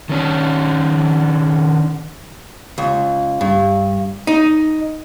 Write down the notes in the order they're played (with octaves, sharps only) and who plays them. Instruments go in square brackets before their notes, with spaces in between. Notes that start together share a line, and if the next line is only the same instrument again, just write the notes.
[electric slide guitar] D#3 C#4 D4
[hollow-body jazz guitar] C#2
G2
D#4